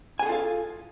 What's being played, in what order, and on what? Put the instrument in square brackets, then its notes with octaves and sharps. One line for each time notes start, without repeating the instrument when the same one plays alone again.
[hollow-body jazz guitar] G#5
G#4
A4
F4
F5